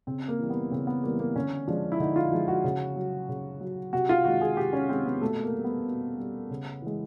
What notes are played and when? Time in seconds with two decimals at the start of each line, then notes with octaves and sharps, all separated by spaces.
0.07 C#3 C4
0.28 A#3
0.39 E3 G3
0.50 B3
0.71 C#3 C4
0.87 B3
1.03 E3 G3 A#3
1.20 A#3
1.36 D3 C#4
1.67 F3 G#3 D4
1.92 E4
2.00 D3 D#4
2.16 F4
2.32 F3 G#3
2.48 F#4
2.64 C#3
2.96 F#3
3.29 C#3
3.61 F#3
3.93 C3 F#4
4.09 F4
4.25 D#3 G#3 F#4
4.41 G#4
4.57 C3 G4
4.73 C#4
4.89 D#3 G#3 C4
5.05 B3
5.21 B2 A3
5.43 A#3
5.54 G3
5.64 B3
5.86 B2
6.18 G3
6.50 C#3
6.82 E3 G#3